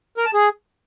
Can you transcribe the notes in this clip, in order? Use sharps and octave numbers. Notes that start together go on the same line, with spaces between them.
A#4
A5
G#4